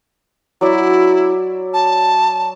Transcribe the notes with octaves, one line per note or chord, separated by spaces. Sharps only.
F#3 E4 D5
A5